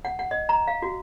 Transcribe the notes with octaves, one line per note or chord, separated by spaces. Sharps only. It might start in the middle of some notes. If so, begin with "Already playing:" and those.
F#5
F#5
D#5
A#5
F5
F#4